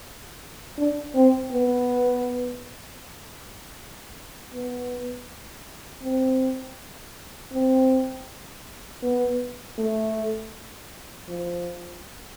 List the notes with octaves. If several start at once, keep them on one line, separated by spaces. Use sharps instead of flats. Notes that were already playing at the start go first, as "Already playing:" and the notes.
D4
C4
B3
B3
C4
C4
B3
A3
F3